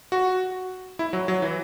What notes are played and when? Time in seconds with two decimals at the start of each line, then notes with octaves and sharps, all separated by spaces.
0.12 F#4
0.99 E4
1.13 F#3
1.28 F#3
1.42 E3